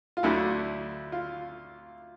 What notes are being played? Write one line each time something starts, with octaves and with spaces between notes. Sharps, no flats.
F4
D2 D3 F#3 A3 E4
F4